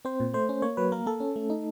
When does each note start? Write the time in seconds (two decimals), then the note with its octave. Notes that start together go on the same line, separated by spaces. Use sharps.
0.05 C4 C5
0.20 A#2
0.33 A3 C5
0.49 C#4
0.62 A#3 C#5
0.77 F#3 B4
0.92 A#3 A#4
1.06 A#3 A4
1.20 C#4
1.36 A3
1.50 D#4